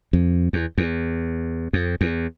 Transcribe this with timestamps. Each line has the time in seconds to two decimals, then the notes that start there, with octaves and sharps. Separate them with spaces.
0.13 F2
0.53 E2
0.78 E2
1.73 F2
2.01 E2